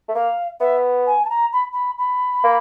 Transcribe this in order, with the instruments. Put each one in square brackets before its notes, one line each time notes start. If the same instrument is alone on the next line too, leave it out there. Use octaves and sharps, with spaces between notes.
[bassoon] A3
[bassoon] A#3 [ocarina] F5
[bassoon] B3 [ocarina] E5
[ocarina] G#5
A5
A#5
B5
B5
B5
[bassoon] A#3